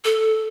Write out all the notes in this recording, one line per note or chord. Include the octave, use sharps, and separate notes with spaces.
A4